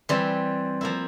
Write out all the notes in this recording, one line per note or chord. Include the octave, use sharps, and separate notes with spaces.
E3 G3 C4
F3 A#3 E4